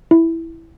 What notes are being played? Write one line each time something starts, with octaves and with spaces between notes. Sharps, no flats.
E4